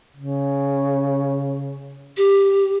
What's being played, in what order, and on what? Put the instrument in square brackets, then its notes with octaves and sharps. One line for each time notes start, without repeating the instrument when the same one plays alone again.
[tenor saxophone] C#3
[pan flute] G4